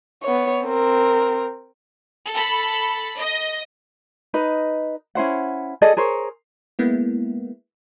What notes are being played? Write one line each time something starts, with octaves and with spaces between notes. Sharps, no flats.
B3 C#5
C4 A#4
A4 B5
D#5
D#4 B4 D#5
C#4 E4 C5 F#5
G#4 A4 D5 D#5
G#4 A#4 C5 C#5
G#3 A#3 B3 E4